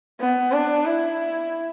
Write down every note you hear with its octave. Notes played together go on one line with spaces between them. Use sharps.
B3
D4
E4